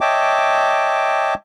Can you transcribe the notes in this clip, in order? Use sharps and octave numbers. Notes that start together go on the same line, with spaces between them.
C#5 D#5 E5 G5 A5 D6